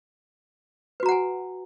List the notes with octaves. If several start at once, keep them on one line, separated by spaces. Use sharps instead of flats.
F#4 B4 F#5 G#5 A#5